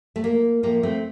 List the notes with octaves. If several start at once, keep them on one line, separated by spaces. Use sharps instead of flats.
A3
A#3
A2 F3 A3 A#3
A3 C4